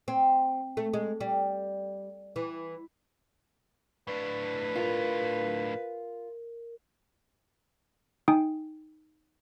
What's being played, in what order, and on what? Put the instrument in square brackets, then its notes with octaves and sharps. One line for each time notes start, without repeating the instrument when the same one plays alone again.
[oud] C4
A3
G#3
G3
E3
[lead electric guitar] A2 D4 [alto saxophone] B4
[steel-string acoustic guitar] F4 [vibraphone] A#4
[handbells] D#4 G5 G#5 D#6